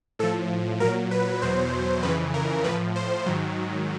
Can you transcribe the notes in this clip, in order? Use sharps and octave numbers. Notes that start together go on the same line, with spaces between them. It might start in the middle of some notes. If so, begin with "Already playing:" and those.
A2 F3 A4
A#2 F#3 A#4
B4
E2 B2 F#3 C5
F2 C#3 E3 B4
A#4
A2 F3 B4
C5
G#2 D#3 F#3